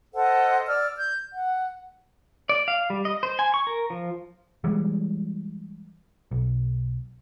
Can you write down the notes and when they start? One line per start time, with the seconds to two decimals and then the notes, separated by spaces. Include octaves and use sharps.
0.14 A4 C5 D#5 F#5
0.67 D5 E6 F6
0.97 G6
1.32 F#5
2.49 D5
2.68 F5
2.90 G3
3.05 D#5
3.23 C5
3.39 G#5
3.54 C#6
3.67 A#4
3.90 F3
4.64 E3 G3 G#3
6.31 B1